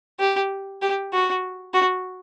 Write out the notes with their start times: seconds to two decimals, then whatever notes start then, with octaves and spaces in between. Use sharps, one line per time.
0.20 G4
0.82 G4
1.13 F#4
1.74 F#4